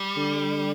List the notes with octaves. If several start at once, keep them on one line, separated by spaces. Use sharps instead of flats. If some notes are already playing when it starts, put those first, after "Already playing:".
Already playing: G3
D3